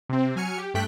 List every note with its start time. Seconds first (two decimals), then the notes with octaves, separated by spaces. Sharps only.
0.09 C3 C4
0.36 F#3 G#5 F6 C#7
0.58 G4
0.74 G2 A3 G5 F#6 B6